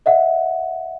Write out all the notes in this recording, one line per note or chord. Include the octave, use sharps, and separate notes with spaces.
D#5 E5 F#5